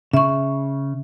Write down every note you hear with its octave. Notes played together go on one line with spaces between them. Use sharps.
C#3 E5 C#6